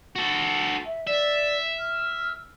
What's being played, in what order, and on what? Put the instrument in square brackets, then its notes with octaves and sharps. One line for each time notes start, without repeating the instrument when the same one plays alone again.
[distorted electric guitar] F#4 A4
[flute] E5
[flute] D5 [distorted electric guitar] E5
[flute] F6